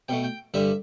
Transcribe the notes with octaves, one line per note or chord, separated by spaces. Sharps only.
B2 A3 G5
G5
G2 D3 G3 E5